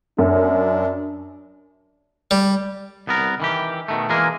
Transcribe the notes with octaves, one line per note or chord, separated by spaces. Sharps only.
F#2 D4
G3
C2 B3 A#4
D#3 E3 G4
B2 D#3 A3
E3 G#3 A#3 G#4 A#4